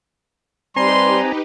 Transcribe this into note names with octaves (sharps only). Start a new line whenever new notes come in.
G3 C4 D#4 G4 B4 G#5 A#5 C6